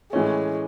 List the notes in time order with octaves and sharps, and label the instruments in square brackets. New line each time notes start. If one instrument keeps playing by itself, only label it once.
[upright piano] A2 E3 A3 C#4 [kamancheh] G#3